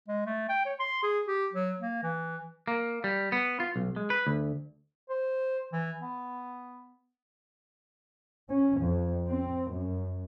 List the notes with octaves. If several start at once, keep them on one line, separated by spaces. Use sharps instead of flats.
G#3
A3
G5
C#5
C6
G#4
G4
F#3
A#3
E3
A#3
G3
B3
F4
B1
G#3
B4
D2
C5
E3
B3
C#4
F2
C4
F#2